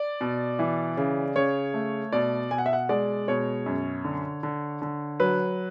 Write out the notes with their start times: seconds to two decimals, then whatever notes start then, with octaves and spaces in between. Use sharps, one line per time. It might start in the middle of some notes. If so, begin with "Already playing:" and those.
Already playing: D5
0.21 B2
0.59 E3
0.97 C#3
1.36 C#3 C#5
1.74 A3
2.12 B2 D5
2.51 B2 G#5
2.58 F#5
2.66 E5
2.73 F#5
2.89 G#3 D5
3.28 B2 C#5
3.66 F#2
4.05 D3
4.43 D3
4.82 D3
5.20 F#3 B4